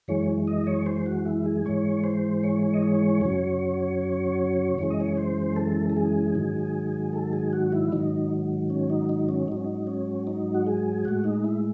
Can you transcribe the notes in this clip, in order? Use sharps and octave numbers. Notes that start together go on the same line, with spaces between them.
F#2 E3 G#3 C#5
D#5
C#5
C5
F#4
E4
G#4
G#2 E3 G#3 C#5
C5
C#5
D#5
C#5
F#2 C#3 F#3
F#2 C#3 E3 G#3 C#5
D#5
C#5
C5
A4
A4
G#4
G#2 D#3 F#3
A4
G#4
F#4
E4
G#2 D#3 F#3 D#4
C#4
D#4
D#4
C#4
G#2 F#3 D#4
C#4
D#4
C#4
D#4
F#4
G#4
A2 G#3 F#4
D#4
E4